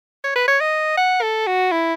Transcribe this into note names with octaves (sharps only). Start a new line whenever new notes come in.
C#5
B4
C#5
D#5
F#5
A4
F#4
E4